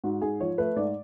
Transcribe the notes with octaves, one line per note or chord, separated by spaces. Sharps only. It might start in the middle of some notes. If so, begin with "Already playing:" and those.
G#2 F#4
G#2 G#4
F3 C#5
A3 B4
G#2 D5